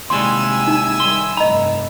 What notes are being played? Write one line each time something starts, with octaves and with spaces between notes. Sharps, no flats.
D#2 C3 G3 G#3 E4 G#5 C6 E6
D#4
D#3 G3 C6
F1 G2 D#5 A#5 B5